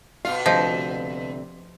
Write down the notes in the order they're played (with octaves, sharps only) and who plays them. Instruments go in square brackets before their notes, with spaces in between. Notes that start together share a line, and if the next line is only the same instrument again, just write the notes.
[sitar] B2 F4 [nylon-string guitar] F5
[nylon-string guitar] D2 C3 [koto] F3 [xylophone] D#5 G6